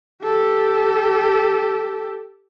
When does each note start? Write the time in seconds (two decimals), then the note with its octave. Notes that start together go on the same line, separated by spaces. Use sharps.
0.24 G4 A4